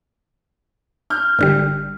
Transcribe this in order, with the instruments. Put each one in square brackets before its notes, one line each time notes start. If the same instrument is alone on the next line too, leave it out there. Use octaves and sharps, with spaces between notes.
[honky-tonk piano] F6 G6
[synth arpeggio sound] G#1 D3 G3